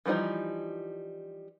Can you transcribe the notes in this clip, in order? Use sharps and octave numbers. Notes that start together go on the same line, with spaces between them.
E3 F3 G3 D#4 A#5